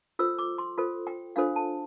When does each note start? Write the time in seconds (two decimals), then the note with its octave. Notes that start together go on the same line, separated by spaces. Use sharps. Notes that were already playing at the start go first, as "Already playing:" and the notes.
0.19 F4 A4 C5 E6
0.38 D6
0.58 C6
0.78 F4 A4 C5
1.07 G5
1.36 D4 F4 A4 C5 F5
1.56 A5